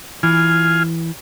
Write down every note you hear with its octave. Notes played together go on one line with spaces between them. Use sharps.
E3 F4 G#5 F6